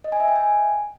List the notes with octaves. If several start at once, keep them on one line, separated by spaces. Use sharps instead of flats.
D#5
G#5
E5
G5
G#5